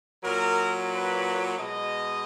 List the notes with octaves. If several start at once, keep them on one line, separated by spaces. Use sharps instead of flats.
A#2 F#3 A#4
B4
B2 G#3 D#5